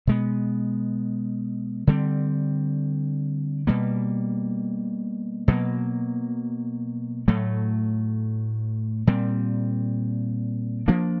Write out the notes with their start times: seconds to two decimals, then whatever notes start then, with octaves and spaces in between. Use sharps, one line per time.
0.07 B2 G#3 B3
1.87 D3 G3 C4
3.67 B2 G3 A#3
5.48 B2 F#3 A#3
7.28 A2 F#3 A3
9.07 A#2 G3 C4
10.88 F3 A#3 D4